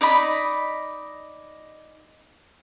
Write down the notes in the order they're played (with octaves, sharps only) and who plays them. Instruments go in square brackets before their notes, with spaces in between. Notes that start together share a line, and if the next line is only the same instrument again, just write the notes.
[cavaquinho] D#4 D5 D#5 B5